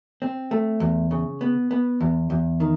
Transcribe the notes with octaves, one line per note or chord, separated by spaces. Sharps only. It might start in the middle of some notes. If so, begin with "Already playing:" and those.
C4
A3
E2
C#3
B3
B3
E2
E2
D#3